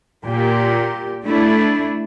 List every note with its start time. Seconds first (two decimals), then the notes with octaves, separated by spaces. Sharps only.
0.23 A#2 G4
1.26 A3 D4 E4